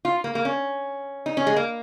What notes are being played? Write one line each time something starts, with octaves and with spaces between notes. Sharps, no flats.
F4
A#3
A#3
C#4
D#4
C#4
G#3
A#3